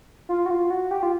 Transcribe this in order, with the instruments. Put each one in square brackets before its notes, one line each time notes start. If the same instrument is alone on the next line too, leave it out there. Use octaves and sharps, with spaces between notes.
[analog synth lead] F4
F#4
F4
F#4
G4
F4